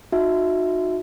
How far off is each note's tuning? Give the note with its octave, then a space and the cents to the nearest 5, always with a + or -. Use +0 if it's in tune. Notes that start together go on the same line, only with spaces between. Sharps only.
D#4 -5 F#4 -30 E5 +0